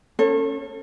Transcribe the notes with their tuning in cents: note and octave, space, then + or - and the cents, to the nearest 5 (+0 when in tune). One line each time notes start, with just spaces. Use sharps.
C#4 +0 A4 +25 C#5 -35